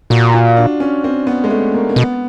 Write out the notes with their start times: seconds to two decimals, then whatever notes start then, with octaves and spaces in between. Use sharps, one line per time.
0.10 A#2 F#4
0.34 F4
0.57 D4
0.80 C#4
1.04 C4
1.27 B3
1.44 G#3
1.50 A3
1.74 A#3
1.89 A#3
1.96 B2 B3